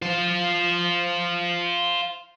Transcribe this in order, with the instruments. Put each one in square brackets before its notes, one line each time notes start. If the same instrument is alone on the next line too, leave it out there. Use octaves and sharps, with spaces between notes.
[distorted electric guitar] F4 C5